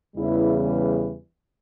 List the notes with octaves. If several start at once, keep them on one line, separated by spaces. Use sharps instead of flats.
E2 C#3 E3 G3 E4